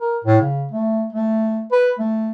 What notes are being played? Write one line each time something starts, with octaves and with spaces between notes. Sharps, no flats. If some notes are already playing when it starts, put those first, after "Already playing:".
A#4
A2
C#3
A3
A3
B4
A3